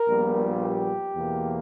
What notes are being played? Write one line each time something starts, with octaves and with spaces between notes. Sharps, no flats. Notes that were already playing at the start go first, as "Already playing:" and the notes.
Already playing: A#4
A#1 A#2 G3 B3
G4
E2 B2 A#3